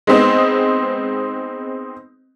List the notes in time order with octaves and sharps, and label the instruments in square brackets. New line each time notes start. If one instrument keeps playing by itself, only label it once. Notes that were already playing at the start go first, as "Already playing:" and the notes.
[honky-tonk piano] G#3 B3 C4 D#4